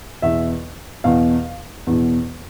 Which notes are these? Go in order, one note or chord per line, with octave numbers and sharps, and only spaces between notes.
E2 B2 E5
E2 B2 F5
E2 B2